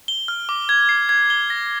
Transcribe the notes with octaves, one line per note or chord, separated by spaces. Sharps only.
G7
F6
D6
G#6
C7
G#6
G7
A#6